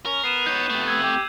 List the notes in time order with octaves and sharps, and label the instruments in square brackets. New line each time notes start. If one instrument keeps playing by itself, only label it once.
[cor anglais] C#4 [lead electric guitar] A#4
[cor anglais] B3 [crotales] C7 D#7 E7
[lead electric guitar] D#4 C#5 [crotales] G6
[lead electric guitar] C3 A3
[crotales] E6 G#6
[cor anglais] G4